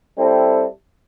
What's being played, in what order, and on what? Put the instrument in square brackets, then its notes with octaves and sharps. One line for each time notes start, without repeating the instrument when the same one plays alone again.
[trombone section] G3 C4 E4 A4